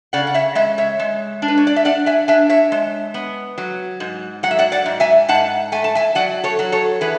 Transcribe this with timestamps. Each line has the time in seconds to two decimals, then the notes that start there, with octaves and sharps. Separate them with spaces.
0.13 C#3 D5 F#5
0.27 F#5
0.34 C#5 E5
0.55 G#3 C#5 E5
0.78 C#5 E5
0.99 G#3
1.42 D4
1.48 B4
1.58 C#5
1.67 D5
1.76 E5
1.85 D4 D5 F#5
2.06 E5 G#5
2.28 D4 E5 G#5
2.49 C#5 E5
2.72 G#3
3.14 B3
3.58 F#3
4.00 G#2
4.43 F#3 F#5
4.51 E5
4.58 D5 F#5
4.72 D5 F#5
4.86 G#2
5.00 E5 G#5
5.28 G#2 F#5 A5
5.72 A3 G#5
5.84 A5
5.95 E5 G#5
6.15 F#3 D5 F#5
6.44 A4 C#5
6.59 F#3
6.72 A4 C#5
7.01 E3 G#4 B4